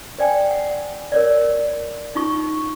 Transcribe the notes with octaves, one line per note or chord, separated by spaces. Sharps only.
C5 D5 G5 G#5
F#5
A#4 C#5 D5
D#4 F4 C#6